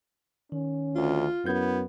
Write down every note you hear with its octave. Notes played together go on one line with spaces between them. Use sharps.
D#3 C#4
D2 F4
F#2 B3 E4 G6 G#6